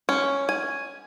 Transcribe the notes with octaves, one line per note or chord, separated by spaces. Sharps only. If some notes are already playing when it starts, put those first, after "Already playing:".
C#4
G#5